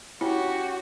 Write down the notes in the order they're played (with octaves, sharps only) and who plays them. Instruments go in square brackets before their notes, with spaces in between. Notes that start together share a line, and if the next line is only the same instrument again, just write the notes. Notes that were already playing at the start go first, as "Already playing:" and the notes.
[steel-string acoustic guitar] C#4 [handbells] E4 [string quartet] F#4 [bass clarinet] G4